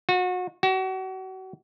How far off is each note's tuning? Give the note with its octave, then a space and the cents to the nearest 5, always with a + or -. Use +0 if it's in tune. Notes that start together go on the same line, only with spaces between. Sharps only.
F#4 -30
F#4 +35